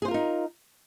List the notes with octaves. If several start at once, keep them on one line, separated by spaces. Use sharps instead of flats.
D#4 F4 G#4 A#4 C5